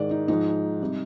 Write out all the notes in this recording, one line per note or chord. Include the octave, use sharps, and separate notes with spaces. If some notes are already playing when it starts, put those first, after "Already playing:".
Already playing: G#2 D#3 G#3 D5
D#4
G#2 F3 G#3 D#4
C3 G3